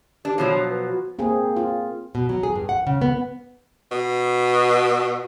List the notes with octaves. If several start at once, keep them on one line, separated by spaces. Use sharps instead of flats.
D4 G4
B2 F3 F#3 C#5
B4
F#4
A#3 C4 G#4
F4
B2
F#3
G#4
G2
F#5
C#3
B3
B2